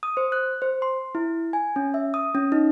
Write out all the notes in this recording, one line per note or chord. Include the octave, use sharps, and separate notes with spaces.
D#6
C5
F#6
C5
C6
E4
G#5
C#4
E5
D#6
C#4
D#4